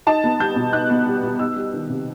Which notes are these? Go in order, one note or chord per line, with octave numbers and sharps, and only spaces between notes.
D#4 A5
B3
G3 G6
B2
D#4 F#6
B3
G3
B2
D#4 E6
G3
D#3
C3